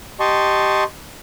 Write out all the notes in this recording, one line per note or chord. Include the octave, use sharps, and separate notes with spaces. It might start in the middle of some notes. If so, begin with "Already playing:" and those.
G4 D#5 A5 C6 C#6